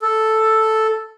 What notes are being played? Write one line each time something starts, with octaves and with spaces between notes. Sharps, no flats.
A4